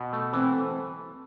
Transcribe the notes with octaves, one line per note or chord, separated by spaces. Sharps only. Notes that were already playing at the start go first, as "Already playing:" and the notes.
Already playing: B2
A3
E3 C4
A4